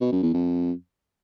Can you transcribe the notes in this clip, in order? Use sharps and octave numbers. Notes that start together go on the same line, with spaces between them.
B2
F#2
E2
F2